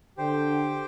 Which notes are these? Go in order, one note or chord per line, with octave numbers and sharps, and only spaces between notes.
D3 G4 C5 G5